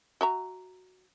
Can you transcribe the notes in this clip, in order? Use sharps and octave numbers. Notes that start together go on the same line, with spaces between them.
F#4 E5 A#5